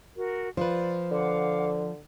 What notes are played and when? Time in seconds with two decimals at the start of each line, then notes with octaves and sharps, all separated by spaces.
0.16 F#4 A#4
0.57 F3 F4 B4 C5 D5
1.11 D3 F5 F#5 D6